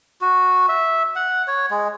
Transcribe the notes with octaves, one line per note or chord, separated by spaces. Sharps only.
F#4
E5
F#5
C#5
G#3